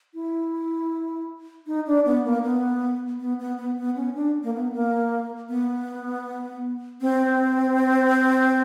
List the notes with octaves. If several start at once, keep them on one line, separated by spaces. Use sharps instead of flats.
E4
D#4
D4
B3
A#3
B3
B3
B3
B3
B3
C#4
D4
A#3
B3
A#3
B3
C4